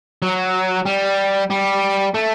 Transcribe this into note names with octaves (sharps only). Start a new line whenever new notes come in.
F#3
G3
G3
A3